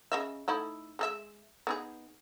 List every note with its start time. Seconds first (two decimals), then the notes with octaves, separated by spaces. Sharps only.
0.12 C#3 D#5 E5
0.48 A3 D#4 E4
0.99 G#3 A4 E5
1.67 B3 D#4 G#4